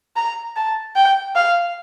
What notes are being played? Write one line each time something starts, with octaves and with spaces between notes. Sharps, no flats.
A#5
A5
G5
F5